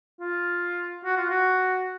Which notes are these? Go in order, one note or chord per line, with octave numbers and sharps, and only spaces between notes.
F4
F#4
F4
F#4